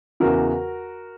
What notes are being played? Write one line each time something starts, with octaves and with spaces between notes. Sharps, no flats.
E2 C#3 E3 F#4 A#4